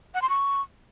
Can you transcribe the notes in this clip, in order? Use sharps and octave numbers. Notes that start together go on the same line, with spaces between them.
F#5
C6
C#6